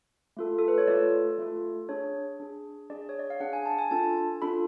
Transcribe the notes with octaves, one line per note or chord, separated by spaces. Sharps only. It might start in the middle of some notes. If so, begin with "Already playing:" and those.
A3 F4 A4
A4
B4
C#5
A3 F4 A4 D5
A3 F4 A4
D4 G#4 C#5
D4 G#4
D4 G#4 D5
C#5
D5
F5
D4 G#4 F#5
G#5
A5
G#5
D4 F4 A4 A5
D4 F4 A4 B5